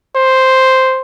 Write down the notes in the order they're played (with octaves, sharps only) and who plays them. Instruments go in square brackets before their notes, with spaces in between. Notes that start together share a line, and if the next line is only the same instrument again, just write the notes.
[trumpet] C5